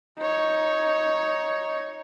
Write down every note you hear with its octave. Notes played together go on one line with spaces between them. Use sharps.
D#4 C#5